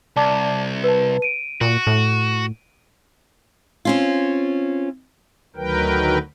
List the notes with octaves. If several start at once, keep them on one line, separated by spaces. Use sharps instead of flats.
C2 D5 A5 D6
B4 A5
D7 D#7
A#2 F#4
A2
C4 C#4 F4
D2 D#3 F#3 A#4 B4 G5